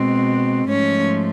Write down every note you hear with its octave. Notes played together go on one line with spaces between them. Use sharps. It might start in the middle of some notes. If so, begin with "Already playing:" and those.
Already playing: B2 G#3 C4
G#2 F3 A3 C#4 C#5